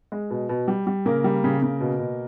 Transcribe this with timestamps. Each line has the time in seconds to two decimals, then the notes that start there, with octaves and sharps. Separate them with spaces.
0.12 G#3
0.30 B2
0.49 B2
0.68 G3
0.87 G3
1.06 C#3 A#3 A#4
1.24 G3
1.44 C#3
1.62 C#3
1.81 B2
1.99 B2